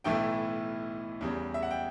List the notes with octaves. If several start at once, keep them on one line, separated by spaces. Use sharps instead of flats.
B1 A2 E3 A3 E5 G5
E2 C#3 G3
E5
F#5
G5